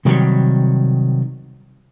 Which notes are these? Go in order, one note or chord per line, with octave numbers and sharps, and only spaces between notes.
C3 D#3 F#3 G3